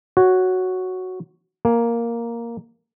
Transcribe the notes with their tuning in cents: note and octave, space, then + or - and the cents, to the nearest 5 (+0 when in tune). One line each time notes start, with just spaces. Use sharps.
F#4 +0 C#5 +0
A#3 +0 G#5 +0